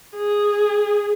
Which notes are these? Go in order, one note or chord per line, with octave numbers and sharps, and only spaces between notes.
G#4